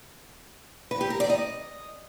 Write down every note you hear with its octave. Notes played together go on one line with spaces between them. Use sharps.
B4
G4
A#4
D5
D#5